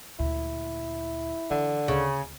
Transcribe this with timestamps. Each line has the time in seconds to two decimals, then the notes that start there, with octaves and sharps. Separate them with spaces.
0.19 D2 A#2 E4
1.50 D3 E3
1.88 D2 C#3